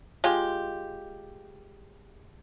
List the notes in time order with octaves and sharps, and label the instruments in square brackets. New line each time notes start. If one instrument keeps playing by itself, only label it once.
[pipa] G#3 F4 G4